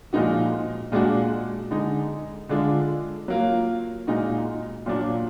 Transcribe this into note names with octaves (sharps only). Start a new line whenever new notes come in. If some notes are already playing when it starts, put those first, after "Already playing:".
A#2 F3 G#3 D#4 F#4
A#2 G#3 D4 F#4
D3 G#3 D#4
D3 G#3 D4 F4
F#3 A#3 F4
A#2 G#3 D#4 F#4
A#2 F#3 D4 F4